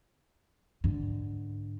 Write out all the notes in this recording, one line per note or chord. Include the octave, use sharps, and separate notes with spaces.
G#2 D3